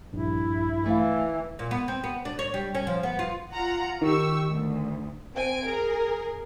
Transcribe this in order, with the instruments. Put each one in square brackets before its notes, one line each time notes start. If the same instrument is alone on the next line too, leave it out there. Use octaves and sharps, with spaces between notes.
[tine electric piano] A#1 G2 [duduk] E4
[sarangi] E3 [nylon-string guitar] A3 F5
[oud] A#2
B3
C4
B3
D4
C#5
G3
C#4
F3
B3
F4
[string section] F4 F#5 A#5
[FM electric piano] D#3 [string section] G4 C#6 E6
[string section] D2
[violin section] C4 G#5 D7
G#4 A#4